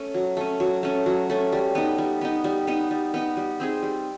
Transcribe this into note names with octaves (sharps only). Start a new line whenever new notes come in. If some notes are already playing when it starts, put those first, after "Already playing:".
Already playing: A3 C#4
F#3
A3 C#4
F#3
A3 C#4
F#3
A3 C#4
G3
B3 D#4
G3
B3 D#4
G3
B3 D#4
G3
B3 D#4
G3
C4 D#4 G#4
G3